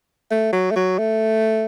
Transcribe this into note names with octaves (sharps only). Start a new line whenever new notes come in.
A3
F#3
A3
F#3
A3